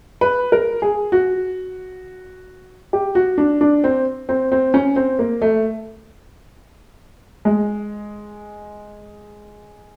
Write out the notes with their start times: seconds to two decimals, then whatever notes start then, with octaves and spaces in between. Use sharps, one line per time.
0.21 B4
0.52 A#4
0.82 G#4
1.12 F#4
2.93 G4
3.15 F#4
3.38 D4
3.61 D4
3.84 C4
4.29 C4
4.52 C4
4.74 C#4
4.96 C4
5.19 A#3
5.42 A3
7.45 G#3